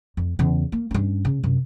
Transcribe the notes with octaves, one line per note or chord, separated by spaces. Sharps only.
F2
E2 C#3
A#3
G2 C#4
C#3
F#2 C3